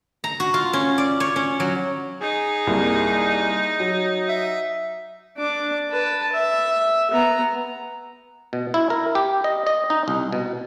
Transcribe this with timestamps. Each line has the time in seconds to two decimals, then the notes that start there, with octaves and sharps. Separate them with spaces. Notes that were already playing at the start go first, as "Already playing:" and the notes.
0.24 A#5
0.40 F#4
0.54 F4
0.73 C#4
0.98 D5
1.20 C#5
1.36 C#4
1.60 F#3
2.21 D#4 G#4
2.67 C2 A#3
3.80 F#3
4.29 E5
5.37 D4 D6
5.90 B4 A5
6.33 E5
7.11 B3 A#5
8.53 B2
8.74 E4
8.90 A#4
9.15 G4
9.44 D#5
9.67 D#5
9.90 D#4
10.08 C2
10.32 B2